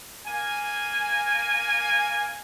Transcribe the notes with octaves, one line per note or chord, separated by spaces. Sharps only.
A#3 G#5